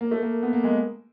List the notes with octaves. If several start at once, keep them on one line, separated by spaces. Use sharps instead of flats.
A#3
A3
A#3
B3
A#3
G#3